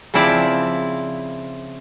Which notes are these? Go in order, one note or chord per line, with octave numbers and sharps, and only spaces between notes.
C#3 F3 C4 E4 D5